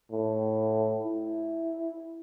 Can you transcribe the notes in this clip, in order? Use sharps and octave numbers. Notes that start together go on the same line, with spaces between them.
A2
E4